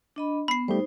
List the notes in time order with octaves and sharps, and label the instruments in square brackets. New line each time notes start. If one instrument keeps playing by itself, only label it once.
[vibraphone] D4 D#5 B5
[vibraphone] B3 [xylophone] B5 C7
[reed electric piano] G3 A3 G4 [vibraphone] D#4 C5